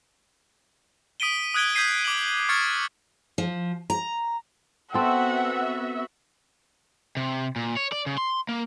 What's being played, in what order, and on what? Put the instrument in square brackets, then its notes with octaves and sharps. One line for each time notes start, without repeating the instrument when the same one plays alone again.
[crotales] D#6 B6 D7 D#7 G7
D#6 F#6 G#6 D7 G7
D#6 G6 G#6 B6 C7 D#7
D6 D#7 F#7
C#6 F6 G#6 A6 C7 C#7
[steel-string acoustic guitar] F3
A#5
[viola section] B3 F#4 E5 [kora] C4 A4 [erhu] F#5
[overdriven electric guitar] C3
A#2
C#5
D5
C#3
C6
A#3